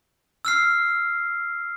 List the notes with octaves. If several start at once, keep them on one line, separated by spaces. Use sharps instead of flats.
E6 F6 C7